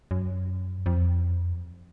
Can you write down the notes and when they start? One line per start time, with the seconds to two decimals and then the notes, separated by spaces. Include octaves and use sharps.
0.11 F#2
0.86 F2